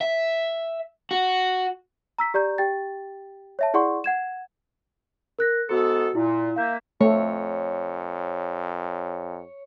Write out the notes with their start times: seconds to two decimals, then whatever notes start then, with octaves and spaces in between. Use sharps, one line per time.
0.01 E5
1.11 F#4
2.18 A#5 E6 B6
2.34 G4 D5 A#5 G6
2.58 G4 G5 A6
3.59 C#5 E5 A5
3.74 E4 G#4 D5 F#5 C6 C#6
4.04 F#5 G#6 E7
5.39 A#4 F#6 A#6
5.69 G#2 B3 F#4 A4 C#7
6.15 A#2 E4
6.56 A#3 E5 F5 G6
7.01 F2 A3 C#5